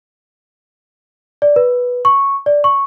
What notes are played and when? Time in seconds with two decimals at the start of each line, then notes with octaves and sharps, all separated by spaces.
1.42 D5
1.56 B4
2.05 C#6
2.46 D5
2.64 C#6